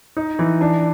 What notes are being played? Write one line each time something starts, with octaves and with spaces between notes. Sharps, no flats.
D#4
E3
D4